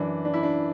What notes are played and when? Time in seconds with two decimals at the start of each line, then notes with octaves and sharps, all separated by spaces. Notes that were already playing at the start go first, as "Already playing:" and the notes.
Already playing: F#2 E3 D4
0.25 D4
0.34 E4
0.43 D4